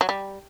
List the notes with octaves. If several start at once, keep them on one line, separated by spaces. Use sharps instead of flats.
F#3
G3